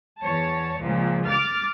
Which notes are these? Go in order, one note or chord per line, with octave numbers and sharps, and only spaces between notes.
E2 C#5 A5
C#2 A#2 F3
D6 F6 A6